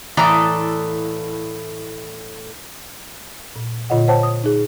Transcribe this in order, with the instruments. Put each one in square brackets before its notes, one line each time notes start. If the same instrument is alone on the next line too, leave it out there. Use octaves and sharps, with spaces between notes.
[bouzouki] A2 A4 [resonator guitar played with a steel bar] E3 D5 A#5 [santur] E5 F5 D#6
[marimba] A#2
A#2 D3 F4 C#5 D#5 F#5
C5 C#5 F#5 G5 A5
D#6
D#4 G#4